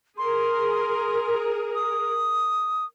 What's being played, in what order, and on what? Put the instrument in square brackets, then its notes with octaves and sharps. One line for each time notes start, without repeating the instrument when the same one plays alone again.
[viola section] G#4 A#4 [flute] C6
[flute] D#6